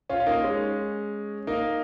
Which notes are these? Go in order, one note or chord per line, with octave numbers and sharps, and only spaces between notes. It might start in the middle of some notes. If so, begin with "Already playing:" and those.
C#4 F4
F4
A#3 D#4
G#3 C#4
A#3 D#4